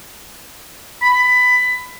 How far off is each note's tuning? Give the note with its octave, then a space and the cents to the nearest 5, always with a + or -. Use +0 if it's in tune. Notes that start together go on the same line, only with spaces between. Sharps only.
B5 +15